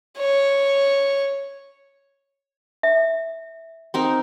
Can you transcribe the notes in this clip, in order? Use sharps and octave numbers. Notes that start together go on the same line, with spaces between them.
C#5
E5
C4 D#4 A#4